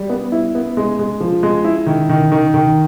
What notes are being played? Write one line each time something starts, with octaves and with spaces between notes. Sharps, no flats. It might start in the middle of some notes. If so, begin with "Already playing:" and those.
Already playing: G3
B3
E4
B3
G#3
G#3
F3
G#3
E4
D#3
D#3
D#3
D#3